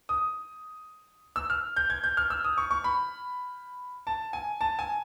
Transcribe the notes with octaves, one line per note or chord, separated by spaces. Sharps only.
D#6
E6
F6
G6
G#6
G6
F6
E6
D#6
C#6
C#6
B5
A5
G#5
A5
G#5